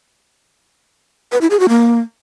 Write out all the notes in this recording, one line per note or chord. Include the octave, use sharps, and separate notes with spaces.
B4
E4
G#4
F#4
A#3